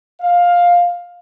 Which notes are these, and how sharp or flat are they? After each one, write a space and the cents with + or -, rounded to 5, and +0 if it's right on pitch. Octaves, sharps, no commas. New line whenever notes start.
F5 +10